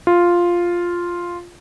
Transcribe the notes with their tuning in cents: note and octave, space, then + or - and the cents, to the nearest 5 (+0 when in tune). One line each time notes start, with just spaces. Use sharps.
F4 +0